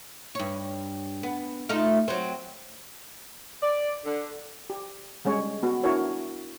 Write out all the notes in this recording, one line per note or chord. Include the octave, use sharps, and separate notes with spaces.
G2 C#5
B3
A3 D#4 F4
F#3 C4
D5
D3
G4
G3 G#3 C#4 C#5
B3 F#4
D4 E4 F#4 A#4 C#5